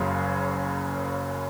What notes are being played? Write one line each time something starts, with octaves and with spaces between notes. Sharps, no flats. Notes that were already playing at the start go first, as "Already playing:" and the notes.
Already playing: F#1 F#2 C#3 G#4 C#5